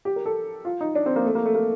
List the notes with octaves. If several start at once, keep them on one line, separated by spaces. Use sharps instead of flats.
G4
A#4
A4
F4
D#4
D4
C4
A#3
A3
A#3
A3
A#3